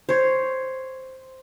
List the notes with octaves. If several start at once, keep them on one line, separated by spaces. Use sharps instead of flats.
C5 C#5